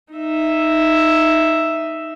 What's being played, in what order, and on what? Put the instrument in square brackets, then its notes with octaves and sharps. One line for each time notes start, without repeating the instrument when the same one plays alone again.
[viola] D#4 E5